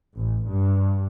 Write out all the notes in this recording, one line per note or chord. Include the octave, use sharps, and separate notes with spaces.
A1
G2